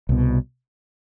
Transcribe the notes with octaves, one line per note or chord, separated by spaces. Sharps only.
C2 B2